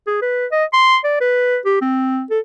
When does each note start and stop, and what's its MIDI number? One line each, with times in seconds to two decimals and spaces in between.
0.07 0.19 68
0.22 0.46 71
0.52 0.65 75
0.73 0.97 84
1.04 1.20 74
1.21 1.58 71
1.65 1.78 67
1.81 2.24 60
2.30 2.39 69